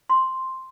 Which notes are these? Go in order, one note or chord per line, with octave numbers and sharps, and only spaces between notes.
C6